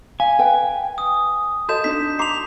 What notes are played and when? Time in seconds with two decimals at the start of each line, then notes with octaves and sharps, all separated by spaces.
0.20 F5 G#5
0.39 B4 G5
0.98 D#6
1.69 F#4 A4 D#5 A5 G6 E7
1.84 D4 D#4 B6
2.19 F#4 A#5 D6 C7 F7